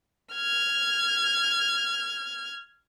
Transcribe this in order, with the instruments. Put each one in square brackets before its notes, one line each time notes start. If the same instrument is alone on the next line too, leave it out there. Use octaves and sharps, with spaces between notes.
[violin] F6 G#6